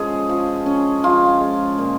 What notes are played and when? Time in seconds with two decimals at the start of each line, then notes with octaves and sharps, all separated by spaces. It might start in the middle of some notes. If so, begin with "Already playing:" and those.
Already playing: F3 G#3 C#4 G#4 C#5
0.29 F3
0.66 C#4
1.03 F3 F4
1.40 G#3
1.78 A#2